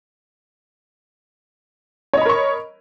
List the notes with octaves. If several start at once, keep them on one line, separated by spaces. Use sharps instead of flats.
A#4 C#5 D#5 B5 C#6